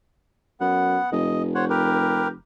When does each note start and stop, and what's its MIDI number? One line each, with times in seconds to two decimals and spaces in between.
0.61 0.98 42
0.61 1.10 59
0.61 1.10 78
1.12 2.34 29
1.12 1.43 75
1.55 1.65 72
1.55 1.65 73
1.55 1.65 78
1.70 2.28 67
1.70 2.28 70
1.70 2.28 71